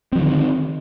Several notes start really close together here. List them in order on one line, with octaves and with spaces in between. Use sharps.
C4 F3 D3 D#3